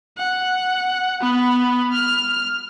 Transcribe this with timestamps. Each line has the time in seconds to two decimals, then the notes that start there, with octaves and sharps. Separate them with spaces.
0.18 F#5
1.21 B3 B5
1.92 F6